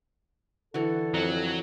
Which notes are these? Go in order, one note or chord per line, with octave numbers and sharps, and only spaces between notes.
D3 E3 F#4 A4
F2 F#3